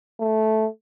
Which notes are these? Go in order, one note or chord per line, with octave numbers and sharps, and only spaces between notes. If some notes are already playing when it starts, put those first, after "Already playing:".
A3